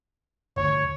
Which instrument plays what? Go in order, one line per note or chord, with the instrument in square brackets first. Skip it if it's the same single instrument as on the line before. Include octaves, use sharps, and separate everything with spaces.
[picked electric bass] G1 D2 [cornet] C#5